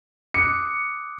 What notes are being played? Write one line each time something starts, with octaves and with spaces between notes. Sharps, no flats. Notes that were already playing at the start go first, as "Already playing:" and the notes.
D6 D#6 F#6 C#7